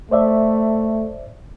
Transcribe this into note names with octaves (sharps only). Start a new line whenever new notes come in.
A3 C5 D5 E5